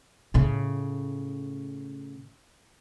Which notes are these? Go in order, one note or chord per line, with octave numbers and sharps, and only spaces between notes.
A2 C#3